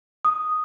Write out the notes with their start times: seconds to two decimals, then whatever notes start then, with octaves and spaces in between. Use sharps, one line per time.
0.25 D#6